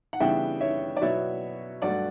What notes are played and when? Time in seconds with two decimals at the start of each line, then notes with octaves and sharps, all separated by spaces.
0.13 F#5
0.20 C#3 E3 G3 B3 D4 E5 G5
0.60 C#5 E5
0.97 D5
1.01 B2 F#3 B3 E4 C#5 E5
1.82 G2 F#3 A3 D5 F#5